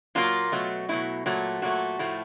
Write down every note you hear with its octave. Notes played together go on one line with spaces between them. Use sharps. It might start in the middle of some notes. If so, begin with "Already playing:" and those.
A#2 F#3 A#3 F4
B2 F#3 A3
B2 F#3 A3 E4
A#2 F#3 A3
A#2 F#3 A3 F#4
A2 F3 A3